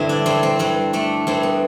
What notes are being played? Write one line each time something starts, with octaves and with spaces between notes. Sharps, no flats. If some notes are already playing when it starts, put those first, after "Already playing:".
Already playing: G2 D3 C4 E4
D4
G2 C4
C4
G2 C4
A3 D4
G2 C4
B3